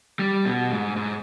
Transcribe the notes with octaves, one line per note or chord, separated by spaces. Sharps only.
G3
B2
G#2
G#2